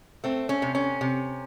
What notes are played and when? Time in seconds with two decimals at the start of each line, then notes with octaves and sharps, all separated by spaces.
0.24 A3 C4
0.49 C#4
0.62 C3
0.75 C#4
1.01 C3